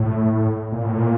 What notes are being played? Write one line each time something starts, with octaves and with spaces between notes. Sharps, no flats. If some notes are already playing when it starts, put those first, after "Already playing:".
Already playing: A2
A#2
A2
A#2